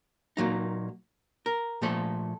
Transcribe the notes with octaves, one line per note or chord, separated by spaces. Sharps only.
A#2 F#3 A#3 D#4
A#4
A#2 F3 A3 A4